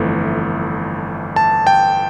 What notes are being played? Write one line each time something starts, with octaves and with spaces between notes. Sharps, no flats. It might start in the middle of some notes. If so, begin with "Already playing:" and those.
Already playing: G1 F2 E3 A3
A5
G5